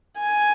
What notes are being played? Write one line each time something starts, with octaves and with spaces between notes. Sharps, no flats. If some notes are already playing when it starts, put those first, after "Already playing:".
G#5